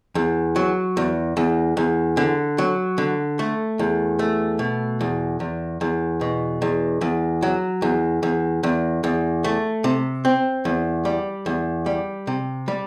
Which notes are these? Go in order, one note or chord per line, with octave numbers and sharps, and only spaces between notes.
E2
F#3
E2
E2
E2
D3
F#3
D3
A3
E2
A3
B2
E2
E2
E2
B2
E2
E2
F#3
E2
E2
E2
E2
A3
C3
C4
E2
G3
E2
G3
C3
G3